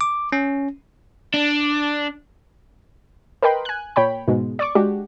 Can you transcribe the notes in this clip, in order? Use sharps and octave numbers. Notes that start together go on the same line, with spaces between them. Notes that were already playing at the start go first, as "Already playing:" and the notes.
D6
C#4
D4
A#4 B4 D#5 G5 B5 C6
G#5 F#6
A#2 C#5 G5 B5
G#2 B2 G#3
D5 C#6 D6
G#3 D4 F#4 G4